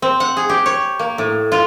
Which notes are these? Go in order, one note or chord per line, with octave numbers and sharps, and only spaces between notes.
C4
F#5
G#4
G4
C#5
A#3
A2
F4